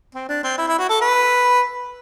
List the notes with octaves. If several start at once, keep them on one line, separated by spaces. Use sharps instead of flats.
C4
D4
C4
E4
E4
F#4
A4
B4